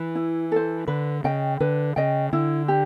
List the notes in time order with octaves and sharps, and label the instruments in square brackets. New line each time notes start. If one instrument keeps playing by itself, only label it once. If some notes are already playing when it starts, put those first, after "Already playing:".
Already playing: [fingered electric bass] E3
[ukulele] E4
A4 C5
[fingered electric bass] D3 [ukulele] B4
[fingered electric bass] C#3 [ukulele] D#5 G5
[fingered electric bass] D3 [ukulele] B4
[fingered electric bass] C#3 [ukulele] D#5 G5
[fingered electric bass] D3 [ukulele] E4
[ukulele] G4